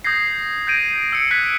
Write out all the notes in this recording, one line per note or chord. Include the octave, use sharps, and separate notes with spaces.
D#6 G6 G#6 A#6 C7
G6 G#6 A#6 D7 D#7
E6 C#7 D7
F#6 G#6 B6